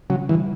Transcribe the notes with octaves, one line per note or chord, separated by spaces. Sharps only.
C#3 F#3
E3 G3